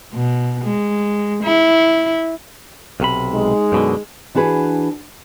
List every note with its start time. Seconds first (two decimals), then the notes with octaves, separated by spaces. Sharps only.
0.13 B2
0.64 G#3
1.43 E4
3.00 B1 C3 B5
3.32 G#3 D#4
3.72 F#2 B2 D3
4.35 E3 D4 F#4 G#4 B4